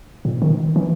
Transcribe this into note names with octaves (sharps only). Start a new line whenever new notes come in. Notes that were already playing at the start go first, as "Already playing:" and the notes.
A#2
D#3
E3